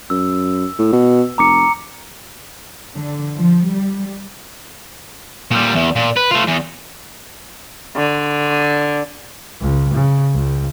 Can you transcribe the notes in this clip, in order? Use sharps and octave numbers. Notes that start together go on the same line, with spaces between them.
F#2 E6
A2
B2
F1 A#5 D6 C#7
D3
F3
G3
A#2 G3
E2
A#2
B4
A3 F4
E2
D3
C#2
C#3
C#2